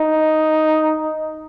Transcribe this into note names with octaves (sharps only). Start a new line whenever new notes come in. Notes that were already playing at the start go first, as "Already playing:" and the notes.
Already playing: D#4